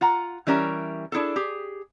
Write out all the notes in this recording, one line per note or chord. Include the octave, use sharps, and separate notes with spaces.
F4 F#5 A#5
E3 G3 C#4 A#4 C5 E5
D4 E4 G#4 A4
G4 G#4